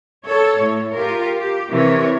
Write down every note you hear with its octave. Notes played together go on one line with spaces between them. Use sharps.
A4 C#5
A2
F4 G4 A#4
G4
C3 E3 A#4 C#5